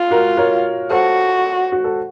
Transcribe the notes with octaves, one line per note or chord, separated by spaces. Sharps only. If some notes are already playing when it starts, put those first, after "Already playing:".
Already playing: F4
F#4 A#4
A#4 C#5
F#4 A4 C5
F#4
A4